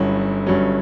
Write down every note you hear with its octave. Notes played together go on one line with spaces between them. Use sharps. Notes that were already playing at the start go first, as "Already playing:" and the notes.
Already playing: G1 G2 F#3 C#4 E4
G1 G2 F#3 C#4